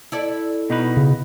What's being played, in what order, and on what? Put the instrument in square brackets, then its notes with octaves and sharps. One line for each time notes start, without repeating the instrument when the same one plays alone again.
[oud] E4 A4 D5
[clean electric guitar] B2 D#4 B4
[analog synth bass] C#3